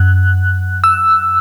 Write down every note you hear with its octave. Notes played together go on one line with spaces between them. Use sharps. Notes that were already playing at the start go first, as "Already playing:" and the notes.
Already playing: F#2 F#6
E6